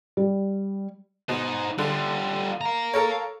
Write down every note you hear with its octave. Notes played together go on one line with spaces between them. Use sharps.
G3
B2 D#4 C5
D3 G3 F4
F5 A#5
A4 A#4 C#5